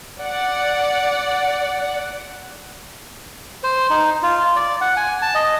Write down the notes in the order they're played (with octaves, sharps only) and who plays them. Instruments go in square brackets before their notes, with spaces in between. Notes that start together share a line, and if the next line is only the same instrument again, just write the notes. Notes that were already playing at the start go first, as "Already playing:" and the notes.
[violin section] D5 F#5
[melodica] C5
D#4
F4
D5
F#5
G#5
A5
D#5